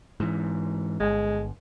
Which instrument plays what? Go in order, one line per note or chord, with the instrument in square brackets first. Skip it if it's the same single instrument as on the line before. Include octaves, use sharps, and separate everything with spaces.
[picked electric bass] G#2 E3
[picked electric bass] G1 [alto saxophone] G#3